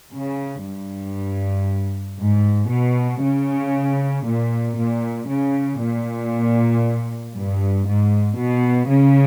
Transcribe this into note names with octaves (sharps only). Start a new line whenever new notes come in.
C#3
G2
G#2
B2
C#3
A#2
A#2
C#3
A#2
G2
G#2
B2
C#3